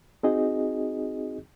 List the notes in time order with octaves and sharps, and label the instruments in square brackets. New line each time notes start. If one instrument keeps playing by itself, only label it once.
[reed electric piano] C4 D#4 F#4 G#4 D#5